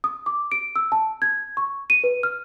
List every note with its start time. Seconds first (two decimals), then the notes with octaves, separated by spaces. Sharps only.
0.04 D#6
0.26 D6
0.52 D7
0.76 E6
0.92 A5
1.22 G#6
1.57 C#6
1.90 D#7
2.04 B4
2.23 F6